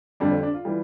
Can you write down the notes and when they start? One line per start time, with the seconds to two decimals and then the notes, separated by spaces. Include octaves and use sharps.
0.20 F2 D3 G3 D4
0.32 C4
0.43 D4
0.54 F4
0.65 E3 G3